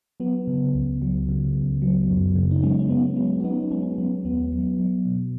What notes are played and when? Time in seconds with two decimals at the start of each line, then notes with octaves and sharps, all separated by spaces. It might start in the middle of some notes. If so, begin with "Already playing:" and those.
0.20 F#3 B3
0.47 C#3
0.75 C#2
1.02 F#3
1.29 C#3
1.56 C#2
1.82 F#3
2.10 F#2
2.35 C#3
2.51 D#4
2.62 F#3 G#3 C#4
2.79 C#4
2.89 F#3 B3
3.16 F#3 G#3 C#4
3.40 F#4
3.44 F#3 B3 D#4
3.71 F#3 G#3 C#4
3.93 G#3
3.98 F#3 B3
4.25 D#2 B3
4.52 F#3
4.79 F#3
5.05 B2